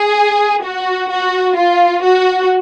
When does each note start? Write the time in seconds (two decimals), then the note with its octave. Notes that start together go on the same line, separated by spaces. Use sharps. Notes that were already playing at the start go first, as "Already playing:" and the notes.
Already playing: G#4
0.64 F#4
1.10 F#4
1.57 F4
2.04 F#4